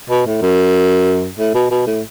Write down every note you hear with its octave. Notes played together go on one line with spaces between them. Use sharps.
B2
A2
F#2
A2
B2
B2
A2